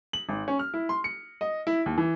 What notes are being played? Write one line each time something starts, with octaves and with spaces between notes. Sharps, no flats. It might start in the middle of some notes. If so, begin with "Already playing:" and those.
F#7
G#1
C#4
F6
E4
C6
C#7
D#5
E4
D#2
E3